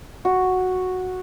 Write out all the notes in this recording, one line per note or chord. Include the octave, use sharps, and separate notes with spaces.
F#4